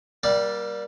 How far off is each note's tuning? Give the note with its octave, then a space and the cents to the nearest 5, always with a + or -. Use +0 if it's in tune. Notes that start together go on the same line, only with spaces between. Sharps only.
G3 -5 A#3 +30 D5 +0